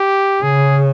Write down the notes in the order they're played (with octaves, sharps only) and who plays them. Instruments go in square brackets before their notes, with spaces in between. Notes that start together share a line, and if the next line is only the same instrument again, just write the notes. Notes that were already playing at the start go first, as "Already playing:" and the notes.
Already playing: [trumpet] G4
[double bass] C#3 [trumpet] G#4